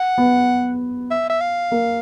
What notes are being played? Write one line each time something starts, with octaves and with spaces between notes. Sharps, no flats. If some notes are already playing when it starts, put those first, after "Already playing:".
Already playing: F#5
B3
E5
E5
F5
A#3